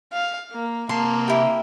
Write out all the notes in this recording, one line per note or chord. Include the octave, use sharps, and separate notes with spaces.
F5
A#3
C3 A#3 A5 C6
E4 G4